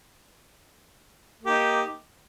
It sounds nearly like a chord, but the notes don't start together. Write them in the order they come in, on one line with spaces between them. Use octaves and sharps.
A#3 G4 D#4